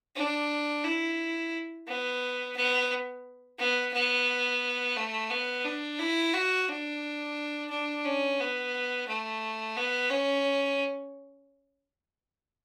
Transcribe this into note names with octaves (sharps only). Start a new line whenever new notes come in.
D4
E4
B3
B3
B3
B3
A3
B3
D4
E4
F#4
D4
D4
C#4
B3
A3
B3
C#4